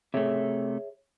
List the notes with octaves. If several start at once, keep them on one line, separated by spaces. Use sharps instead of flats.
C3 A3 G#4 C#5 E5